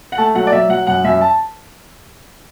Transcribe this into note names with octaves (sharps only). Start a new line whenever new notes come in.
F#5
A3 A5
F#3 F#5
D5
F#3 E5
F#3 F#5
F#2 F#5
F#2 E5
A5